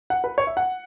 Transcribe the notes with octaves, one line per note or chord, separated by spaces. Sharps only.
F#5
B4
C#5
E5
F#5